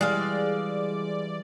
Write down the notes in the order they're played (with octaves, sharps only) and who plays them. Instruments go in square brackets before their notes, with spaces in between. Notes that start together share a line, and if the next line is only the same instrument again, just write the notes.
[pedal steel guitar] E3 G3 [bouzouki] G#3 F5 [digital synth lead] D5